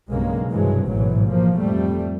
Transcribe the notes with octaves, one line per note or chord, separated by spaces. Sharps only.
B1 G2 C#3 G#3 A#3
G2 C3 E3 F#3 G#3
A1 G#2 B2 E3 F#3
F3 A#3
F2 G3 A3